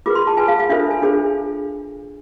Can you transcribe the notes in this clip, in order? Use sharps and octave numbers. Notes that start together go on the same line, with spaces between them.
F4 G#4 B4 D6
C6
A5
F4 G#4 B4 G#5
F5
F5
D4 F4 A4 C5 E5
G#5
D4 G#4 C5